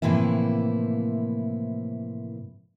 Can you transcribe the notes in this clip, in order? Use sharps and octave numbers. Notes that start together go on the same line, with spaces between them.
A2 C3 E3 F3 A#3 E4